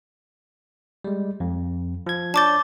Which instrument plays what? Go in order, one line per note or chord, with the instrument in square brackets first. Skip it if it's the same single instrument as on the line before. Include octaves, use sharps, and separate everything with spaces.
[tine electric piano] G3 G#3
F2
F3 G#6
[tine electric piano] D4 C#5 G6 [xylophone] A5 D6 A6